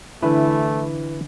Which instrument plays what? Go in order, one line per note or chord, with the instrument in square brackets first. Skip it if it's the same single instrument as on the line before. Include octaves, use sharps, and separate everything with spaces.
[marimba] D3 D4 [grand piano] E3 [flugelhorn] A3 [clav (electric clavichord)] E4 B4